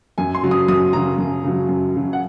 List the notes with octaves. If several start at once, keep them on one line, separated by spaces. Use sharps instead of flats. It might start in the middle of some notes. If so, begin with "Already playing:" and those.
F#2 G#5
C6
C#3 F#3
D#6
F#2 D#6
C#3 F#3 A#5
F#2
C#3 F#3
F#2
C#3 F#3
F#5